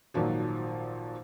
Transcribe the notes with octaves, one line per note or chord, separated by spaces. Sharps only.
G#1 A#2 D#3 F3 F#3